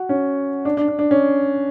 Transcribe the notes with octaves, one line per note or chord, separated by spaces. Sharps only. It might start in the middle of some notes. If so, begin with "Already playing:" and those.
Already playing: F#4
C#4
D4
D4
D4
D4
C#4